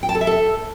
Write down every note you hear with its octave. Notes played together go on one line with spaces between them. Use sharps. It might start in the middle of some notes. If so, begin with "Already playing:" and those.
G5
A5
A4
E5
A4